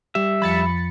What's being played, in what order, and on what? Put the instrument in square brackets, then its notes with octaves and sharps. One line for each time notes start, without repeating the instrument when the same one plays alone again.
[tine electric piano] G3 G4 [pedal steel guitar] E5
[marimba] F2 F3 [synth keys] B5 A6 C#7